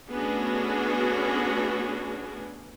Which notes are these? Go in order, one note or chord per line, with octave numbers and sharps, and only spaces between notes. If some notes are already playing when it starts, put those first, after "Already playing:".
A3 B3 C#4 D4 F#4 G#4